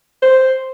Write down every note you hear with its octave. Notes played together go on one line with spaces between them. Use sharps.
C5